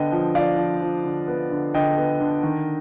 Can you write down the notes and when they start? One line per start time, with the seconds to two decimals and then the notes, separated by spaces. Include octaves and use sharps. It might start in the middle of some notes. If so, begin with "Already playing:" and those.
Already playing: D3 B3 D#5 G5
0.12 F3
0.35 F3 D5 F5
0.58 F3
0.82 F3
1.05 D3
1.28 B3
1.51 D3
1.74 D3 D#5 G5
1.98 B3
2.20 D3
2.43 D#3